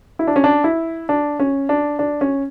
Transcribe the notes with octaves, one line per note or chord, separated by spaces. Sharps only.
E4
D4
C#4
D4
E4
D4
C#4
D4
D4
C#4